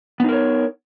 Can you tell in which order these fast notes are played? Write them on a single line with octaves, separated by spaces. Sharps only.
B3 D#4 A#4 C#5